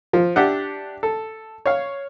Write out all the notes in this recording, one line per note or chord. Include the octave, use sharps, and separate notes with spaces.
F3
D4 G4 E5 F#5
A4
C#5 F5